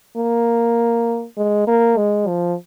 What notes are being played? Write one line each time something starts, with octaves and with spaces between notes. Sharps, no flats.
A#3
G#3
A#3
G#3
F3